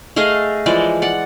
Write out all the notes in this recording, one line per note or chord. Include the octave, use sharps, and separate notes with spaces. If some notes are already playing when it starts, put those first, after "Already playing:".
A3 G#4 D#5 F5
E3 F3 G#3 D5
D5 F#5